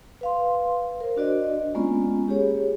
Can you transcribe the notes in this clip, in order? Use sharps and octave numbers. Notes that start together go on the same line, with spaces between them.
B4 F5 C6
A#4 C5
D4 F#4 D5 D#5
G#3 A#3 B3 C#4 F4
G4 G#4 C#5